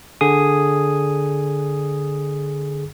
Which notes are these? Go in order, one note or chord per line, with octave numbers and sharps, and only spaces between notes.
D3 G#4 D#6